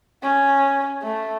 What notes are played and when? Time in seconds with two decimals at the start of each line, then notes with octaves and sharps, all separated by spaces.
0.23 C#4
1.02 A3